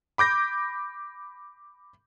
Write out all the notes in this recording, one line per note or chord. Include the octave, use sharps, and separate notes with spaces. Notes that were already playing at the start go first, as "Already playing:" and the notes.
B5 D6 G6 A#6